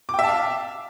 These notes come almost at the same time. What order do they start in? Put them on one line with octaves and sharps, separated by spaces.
D6 G5 E5 A5 F5